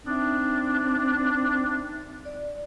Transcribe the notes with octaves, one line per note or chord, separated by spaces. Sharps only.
C4 D4 D#4 E5
D5